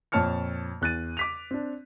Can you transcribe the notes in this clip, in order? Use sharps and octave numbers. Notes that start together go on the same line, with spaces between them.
F2 A#2 C#5 A5 F6 C#7
E2 F#6 A6 D#7
D6 B6 F7
C4 D4